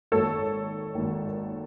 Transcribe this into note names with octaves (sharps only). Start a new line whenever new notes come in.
G#1 G#2 D#3 A4 C#5
G#1 G#2 D#3